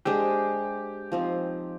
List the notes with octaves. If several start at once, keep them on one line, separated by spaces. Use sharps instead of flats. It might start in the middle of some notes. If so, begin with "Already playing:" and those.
G#3 D4 G4 G#4 C5
F3 C4 D#4